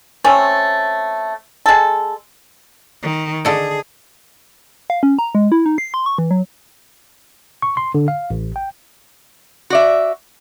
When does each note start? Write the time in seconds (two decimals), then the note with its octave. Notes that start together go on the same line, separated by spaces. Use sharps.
0.24 A3 C4 C#4
1.66 G#3 A4
3.03 D#3
3.45 D3 G#4 A4 D#5
4.90 F5
5.03 C#4
5.19 A#5
5.35 G#3
5.52 E4
5.66 D#4
5.78 C7
5.94 C6
6.06 C#6
6.18 E3
6.31 F#3
7.62 C#6
7.77 C6
7.95 D3
8.08 F5
8.30 A1
8.56 G5
9.70 F#4 D5 E5